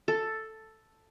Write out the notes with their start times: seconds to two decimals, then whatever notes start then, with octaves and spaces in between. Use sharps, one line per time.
0.08 A4